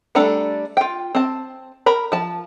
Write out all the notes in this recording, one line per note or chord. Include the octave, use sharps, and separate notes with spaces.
G3 A3 D4 A4 A#5
F4 G5
C4 A5
A#4 A#5 B5
F3 A5